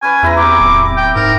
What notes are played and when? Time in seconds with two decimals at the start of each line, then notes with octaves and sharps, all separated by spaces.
0.02 C#4 B4 G#5 D6
0.23 E2 E4 B4 A#5
0.37 C4 G4 D6
0.60 D1
0.97 G5
1.16 G#2 A#4